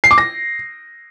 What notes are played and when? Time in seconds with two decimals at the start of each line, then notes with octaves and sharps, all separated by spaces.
0.04 C7
0.11 D6
0.18 A#6